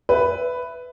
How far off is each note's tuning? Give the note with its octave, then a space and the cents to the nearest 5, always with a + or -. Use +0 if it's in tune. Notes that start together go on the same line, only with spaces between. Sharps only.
B4 +10 E5 +0